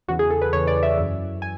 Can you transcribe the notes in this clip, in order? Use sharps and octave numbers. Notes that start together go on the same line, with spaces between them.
E2 C#3 E3 F#4
G#4
A4
B4
E2 C#3 E3 C#5
D5
E5
F#2 E3
G#5